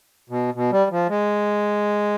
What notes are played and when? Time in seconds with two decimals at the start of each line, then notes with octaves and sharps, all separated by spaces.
0.30 B2
0.54 B2
0.72 G3
0.91 F3
1.09 G#3